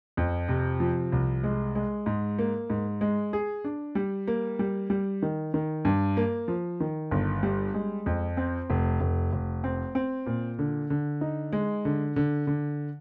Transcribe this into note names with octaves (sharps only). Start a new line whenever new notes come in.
F2
C3
F3
C2
G#3
G#3
G#2
A#3
G#2
G#3
G#4
D4
G3
A#3
G3
G3
D#3
D#3
G2
A#3
F3
D#3
G1
G3
G#3
F2
C4
F1
F1
F1
C4
C4
A#2
D3
D3
D#4
G#3
D3
D3
D3